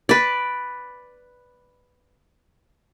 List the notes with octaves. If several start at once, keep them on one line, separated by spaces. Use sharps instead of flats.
B4 D5